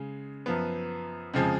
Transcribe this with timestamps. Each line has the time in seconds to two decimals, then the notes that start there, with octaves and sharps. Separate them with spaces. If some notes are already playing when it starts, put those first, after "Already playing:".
Already playing: C#3 G#3
0.46 F#2 F3 B3
1.34 F2 C#3 F3 G#3